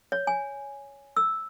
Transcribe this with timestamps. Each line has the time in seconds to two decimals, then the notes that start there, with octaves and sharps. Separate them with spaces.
0.12 C#5
0.27 G#5
1.16 E6